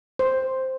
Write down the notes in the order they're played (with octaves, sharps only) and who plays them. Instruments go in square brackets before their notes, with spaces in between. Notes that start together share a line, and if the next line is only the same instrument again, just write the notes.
[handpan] C5